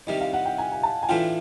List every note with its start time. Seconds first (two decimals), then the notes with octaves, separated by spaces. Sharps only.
0.07 C2 C3 D#3 G3 D#5
0.20 F5
0.33 F#5
0.46 G5
0.58 G#5
0.72 G#5
0.83 A5
1.03 G#5
1.09 A2 E3 A3 D4 F4 G5